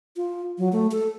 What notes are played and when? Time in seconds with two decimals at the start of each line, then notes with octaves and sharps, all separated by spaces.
0.16 F4
0.58 F#3
0.72 A3
0.91 A4